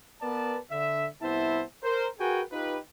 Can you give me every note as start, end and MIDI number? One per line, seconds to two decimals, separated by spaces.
0.22 0.58 59
0.22 0.58 70
0.22 0.58 71
0.22 0.58 74
0.22 0.58 81
0.71 1.06 50
0.71 1.06 76
1.22 1.63 36
1.22 1.63 59
1.22 1.63 64
1.22 1.63 72
1.22 1.63 76
1.22 1.63 81
1.83 2.08 70
1.83 2.08 72
2.20 2.42 66
2.20 2.42 68
2.20 2.42 70
2.20 2.42 71
2.20 2.42 79
2.20 2.42 80
2.52 2.77 63
2.52 2.77 65
2.52 2.77 67
2.52 2.77 71